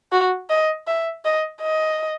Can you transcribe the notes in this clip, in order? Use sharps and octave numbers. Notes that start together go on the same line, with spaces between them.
F#4
D#5
E5
D#5
D#5